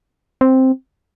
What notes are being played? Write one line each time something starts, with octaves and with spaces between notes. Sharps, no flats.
C4